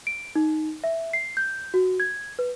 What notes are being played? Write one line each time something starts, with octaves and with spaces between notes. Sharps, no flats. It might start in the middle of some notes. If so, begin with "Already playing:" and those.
D7
D#4
E5
C7
G6
F#4
G#6
B4